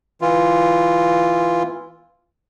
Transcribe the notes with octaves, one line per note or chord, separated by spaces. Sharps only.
E3 F4